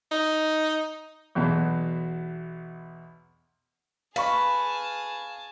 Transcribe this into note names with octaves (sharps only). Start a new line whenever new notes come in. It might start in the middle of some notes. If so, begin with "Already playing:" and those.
D#4
B1 E2 B2
G#4 B4 F5 A5 C#6